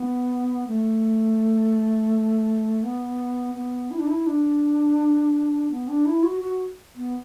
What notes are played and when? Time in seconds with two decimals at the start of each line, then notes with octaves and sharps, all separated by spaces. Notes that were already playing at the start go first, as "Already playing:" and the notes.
Already playing: B3
0.68 A3
2.83 B3
3.55 B3
3.91 E4
3.99 D4
4.07 E4
4.27 D4
5.71 B3
5.88 D4
6.06 E4
6.23 F#4
6.41 F#4
6.96 B3